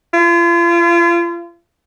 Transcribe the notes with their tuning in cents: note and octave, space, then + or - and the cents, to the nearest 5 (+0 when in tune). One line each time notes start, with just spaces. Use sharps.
F4 -40